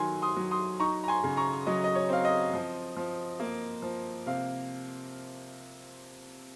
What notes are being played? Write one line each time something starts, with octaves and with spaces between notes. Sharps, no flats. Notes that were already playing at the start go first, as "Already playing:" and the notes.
Already playing: D#3 F#3 G#5 C6
C6 D#6
F#3
C6 D#6
D#4 A#5 C#6
A#5
G#5 C6
C#3
A#5 C#6
F#3 D#5
D#5
C#5
C4 F5
D#5
F3
F3
A#3
F3
C3 F5